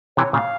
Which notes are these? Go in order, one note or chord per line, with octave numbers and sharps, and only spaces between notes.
C3 E3 C#5
A#2 C#3 F5